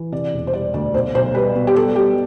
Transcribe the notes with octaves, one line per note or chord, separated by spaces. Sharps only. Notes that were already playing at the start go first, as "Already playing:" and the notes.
Already playing: E3
C3 D5
E1
C5
G3 D5
D2 D5
B1 C5
B1 C5
G3 B4
B2
G4
G3 A4
G3 G4